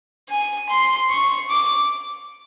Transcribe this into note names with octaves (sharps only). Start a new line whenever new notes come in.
G#5
C6
C#6
D6